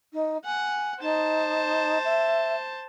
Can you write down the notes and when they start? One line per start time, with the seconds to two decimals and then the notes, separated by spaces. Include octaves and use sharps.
0.13 D#4
0.45 F#5 G#5
1.01 D#4 C5 A5
2.05 E5